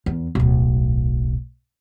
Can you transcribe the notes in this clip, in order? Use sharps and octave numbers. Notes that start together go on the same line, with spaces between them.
E2
D1 B1